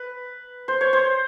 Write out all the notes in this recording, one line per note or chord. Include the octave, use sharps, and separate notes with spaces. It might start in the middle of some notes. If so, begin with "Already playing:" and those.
Already playing: B4
C5
C#5
C5